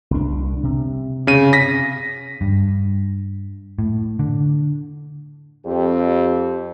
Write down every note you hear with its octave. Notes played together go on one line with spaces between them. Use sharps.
C2 D4
C3
C#3 D#7
A#6 B6
G2
A2
D3
F2 C4 G4